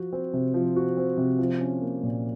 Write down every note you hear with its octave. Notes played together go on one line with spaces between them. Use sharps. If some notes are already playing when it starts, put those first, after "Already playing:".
Already playing: F3 F#4
C4
C3
F3
F#4
C4
C3
F3
C#4
A#3
A#2